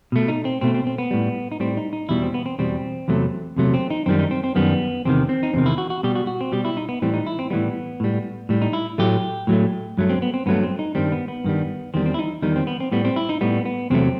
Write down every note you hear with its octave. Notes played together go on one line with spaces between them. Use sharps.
B2 A3
D#4
C4
B2 A3 C4
C4
C4
B3
A2 G3
D#4
A2 G3 C4
D#4
D#4
E2 B2 G3 E4
C4
B3
C4
E2 B2 G3 C4
E2 C3 F#3 A3
E2 C3 F#3 A3
C4
D#4
F#2 D#3 G3 C4
D#4
C4
C4
F#2 D#3 G3 B3
E2 C3 D#3 C4
C4
D#4
E2 C3 D#3 C4
E4
F#4
F#4
B2 G3 G4
F#4
F#4
C4
B2 G3 G4
E4
D#4
B3
A2 E3 G3 C4
D#4
E4
C4
A2 E3 G3 B3
A2 G3
A2 G3
D#4
E4
A2 F#3 A3 G4
A2 F#3 A3
G2 F#3 A3
C4
B3
C4
G2 F#3 A3 B3
C4
D#4
G2 D#3 G3 C4
B3
B3
G2 D#3 G3
E2 D#3 G3 C4
C4
E4
D#4
E2 D#3 G3 D#4
C4
B3
C4
A2 G3 B3
C4
E4
D#4
A2 G3 B3
B3
E2 C3 F#3 A3 C4